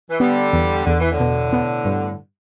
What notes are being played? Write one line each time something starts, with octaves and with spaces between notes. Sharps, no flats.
E3
D3 G3 B3
E2
E2 D3
E3
A2 D3
B2
B3
G2